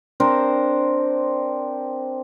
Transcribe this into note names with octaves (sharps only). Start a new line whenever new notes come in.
C4 D4 A#4 C5